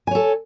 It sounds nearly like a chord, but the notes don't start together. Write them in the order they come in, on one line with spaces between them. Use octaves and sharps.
G#5 C#5 A4